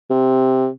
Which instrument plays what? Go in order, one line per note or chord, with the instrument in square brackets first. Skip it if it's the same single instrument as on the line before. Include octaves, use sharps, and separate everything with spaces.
[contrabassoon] C3